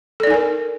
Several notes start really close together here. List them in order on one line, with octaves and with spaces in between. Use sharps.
A4 D5 D#4 G#5 A#4